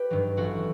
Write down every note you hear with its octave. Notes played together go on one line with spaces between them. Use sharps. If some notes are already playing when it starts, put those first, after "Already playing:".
Already playing: G4 B4
G2 D#3 F#3
A1 F#4